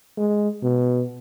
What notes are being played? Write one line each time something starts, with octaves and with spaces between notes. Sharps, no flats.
G#3
B2